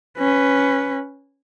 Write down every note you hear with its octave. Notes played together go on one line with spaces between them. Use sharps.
C#4 B4